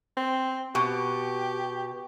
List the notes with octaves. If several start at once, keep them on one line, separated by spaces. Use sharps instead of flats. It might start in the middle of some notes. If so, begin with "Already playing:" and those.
C4
B2 G4